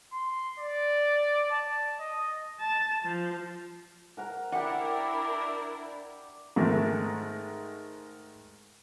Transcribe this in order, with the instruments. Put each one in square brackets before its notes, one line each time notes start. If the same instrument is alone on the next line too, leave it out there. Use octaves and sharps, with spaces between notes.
[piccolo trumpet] C6
D5
A5
D#5
[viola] A5
F3
[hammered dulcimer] A#4 F#5 A#5
[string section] D4 E4 A#4 [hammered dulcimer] G4 D5 [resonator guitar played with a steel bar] F#5
[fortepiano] G#2 D#3 G#3 A3